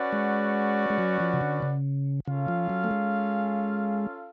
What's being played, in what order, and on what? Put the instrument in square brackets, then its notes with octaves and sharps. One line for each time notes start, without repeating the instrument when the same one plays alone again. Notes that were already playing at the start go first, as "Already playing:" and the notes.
Already playing: [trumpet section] C#4 F#4 B4 D5 F#5
[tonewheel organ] G#3
G#3
F#3
F3
C#3
D3
C#3
[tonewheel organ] C#3 [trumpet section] C#4 F4 A4 F5
[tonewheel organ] F3
F#3
A3
G#3